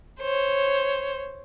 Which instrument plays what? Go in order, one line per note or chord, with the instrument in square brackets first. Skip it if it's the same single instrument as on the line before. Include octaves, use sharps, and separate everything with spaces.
[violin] C5 C#5